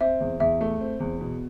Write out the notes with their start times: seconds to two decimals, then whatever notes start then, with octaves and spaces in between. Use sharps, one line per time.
0.01 C4 E5
0.21 E2
0.40 E2 E5
0.61 A3
0.80 C4
1.00 E2
1.21 B2